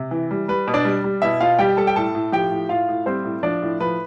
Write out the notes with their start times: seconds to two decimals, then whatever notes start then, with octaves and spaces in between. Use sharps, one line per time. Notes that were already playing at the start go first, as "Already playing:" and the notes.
Already playing: C3
0.11 E3
0.31 G3
0.48 G3 B4
0.68 B2
0.74 D4 D5
0.85 G3
1.04 G3
1.22 B2 E4 E5
1.41 B2 F4 F5
1.59 G3 G4 G5
1.77 G3 A4 A5
1.87 G5
1.96 A2 A4 A5
2.15 A2
2.32 F3 G4 G5
2.51 A2
2.69 A2 F4 F5
2.89 A2
3.06 G3 C4 C5
3.24 A2
3.43 F3 D4 D5
3.62 A2
3.81 F3 B4